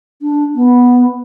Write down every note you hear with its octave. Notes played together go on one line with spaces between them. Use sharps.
D4
B3